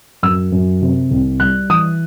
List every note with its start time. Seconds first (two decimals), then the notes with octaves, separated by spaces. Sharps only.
0.23 F#2 E6
0.52 F#2
0.82 C3
1.11 C2
1.40 G3 F#6
1.69 E3 D#6